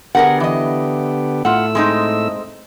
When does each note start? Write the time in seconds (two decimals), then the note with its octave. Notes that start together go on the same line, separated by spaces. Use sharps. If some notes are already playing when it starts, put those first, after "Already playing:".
0.15 D3 B3 G4 G#4 A#4 F#5
0.40 E3 D#5
1.45 A2 A3 F4 F#5 E6
1.75 G#3 C4 D#4